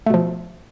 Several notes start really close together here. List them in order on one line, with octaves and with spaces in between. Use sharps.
A3 B2 F3